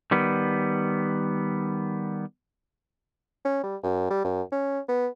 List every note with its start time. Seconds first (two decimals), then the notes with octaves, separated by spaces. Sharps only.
0.11 D#3 G3 B3
3.45 C#4
3.64 G3
3.84 F#2
4.10 G3
4.25 F#2
4.52 C#4
4.88 B3